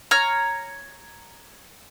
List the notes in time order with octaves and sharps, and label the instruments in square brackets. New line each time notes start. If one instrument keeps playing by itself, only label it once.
[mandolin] C#5 A#5 F6